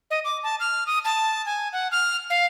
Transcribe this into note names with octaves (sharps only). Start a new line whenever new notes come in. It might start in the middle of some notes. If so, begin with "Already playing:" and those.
D#5
D6
A5
F6
D#6
A5
G#5
F#5
F6
F5